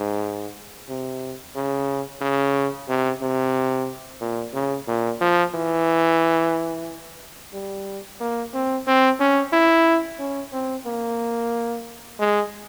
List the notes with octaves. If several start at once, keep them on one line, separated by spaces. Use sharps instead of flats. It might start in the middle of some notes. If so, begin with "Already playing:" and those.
Already playing: G#2
C3
C#3
C#3
C3
C3
A#2
C#3
A#2
F3
E3
G3
A#3
C4
C4
C#4
E4
C#4
C4
A#3
G#3